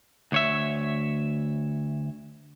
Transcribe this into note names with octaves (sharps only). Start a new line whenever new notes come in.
D2 C#5 E5